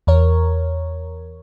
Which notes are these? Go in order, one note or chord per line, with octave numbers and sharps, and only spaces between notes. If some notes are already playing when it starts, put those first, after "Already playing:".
E2 A#4 C#5